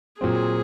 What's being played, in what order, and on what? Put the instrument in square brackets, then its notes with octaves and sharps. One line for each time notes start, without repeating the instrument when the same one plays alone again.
[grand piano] A#2 F#3 C4 [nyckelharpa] G#4